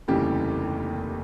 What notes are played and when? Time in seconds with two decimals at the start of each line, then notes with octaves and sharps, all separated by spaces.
0.08 F1 D#2 C#3 E3 G3 G4